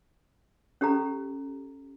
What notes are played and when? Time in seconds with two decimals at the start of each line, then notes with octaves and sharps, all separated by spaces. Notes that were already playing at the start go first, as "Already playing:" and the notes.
0.81 C#4 G4 A4 A#5